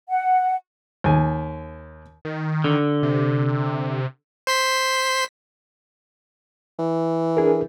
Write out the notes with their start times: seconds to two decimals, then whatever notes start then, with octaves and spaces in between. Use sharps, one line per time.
0.09 F#5
1.04 D#2 G#5
2.25 D#3
2.64 D3
3.03 C3
4.47 C5 C6 B6
6.79 E3
7.37 D4 G#4 A#4